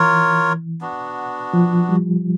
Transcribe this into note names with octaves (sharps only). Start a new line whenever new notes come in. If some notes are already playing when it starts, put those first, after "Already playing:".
Already playing: E3 F4 A#4 C#5
B3 D4 F#4
F3
G3